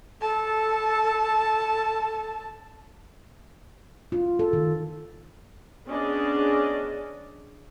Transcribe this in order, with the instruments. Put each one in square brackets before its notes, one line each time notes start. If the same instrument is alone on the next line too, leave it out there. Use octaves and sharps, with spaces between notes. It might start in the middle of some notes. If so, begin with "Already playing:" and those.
[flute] A4 [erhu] A5
[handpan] F4
A4
D#3
[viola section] B3 C#4 D4 G#4 D5 D#5